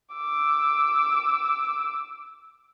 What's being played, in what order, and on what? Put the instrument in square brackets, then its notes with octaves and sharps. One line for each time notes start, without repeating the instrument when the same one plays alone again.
[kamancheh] D6 E6